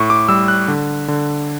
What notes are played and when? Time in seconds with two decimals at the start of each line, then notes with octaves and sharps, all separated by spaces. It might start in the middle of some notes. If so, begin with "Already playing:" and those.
Already playing: A2 C#6
0.10 D6
0.29 G3 E6
0.48 F#6
0.68 D3
1.08 D3